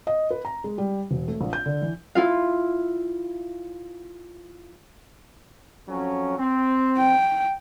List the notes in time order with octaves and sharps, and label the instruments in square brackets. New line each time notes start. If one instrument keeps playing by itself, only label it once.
[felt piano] D#5
B4
A#5
G#3
G3
E1
A3
A#1
G6
D3
E3
[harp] E4 F4 F5
[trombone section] F2 F#3 C#4
C4
[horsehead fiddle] G5